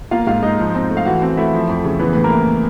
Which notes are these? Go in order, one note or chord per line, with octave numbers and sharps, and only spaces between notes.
A#3 F4 F5
G#2 F4 F5
G#2 D#4 D#5
F3
C4
A3
F5
E3 F#4 F#5
C4
A3 E4 E5
F3
F2
C#3
E3 B3 B4
A2 B4
A#3 A#4
A2